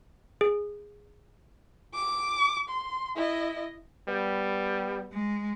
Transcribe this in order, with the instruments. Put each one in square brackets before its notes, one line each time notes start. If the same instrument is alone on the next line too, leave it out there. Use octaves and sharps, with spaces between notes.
[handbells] G#4
[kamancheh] D6
C6
E4 D#5
[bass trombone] G3 [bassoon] B3
[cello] G#3